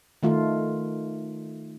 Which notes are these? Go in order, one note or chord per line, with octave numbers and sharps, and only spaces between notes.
D#3 A3 F4